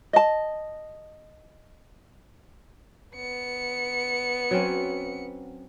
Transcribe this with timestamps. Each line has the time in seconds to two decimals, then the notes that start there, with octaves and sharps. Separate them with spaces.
0.13 D#5 A5
3.16 B3 C#7
4.51 F#3 C4 C#4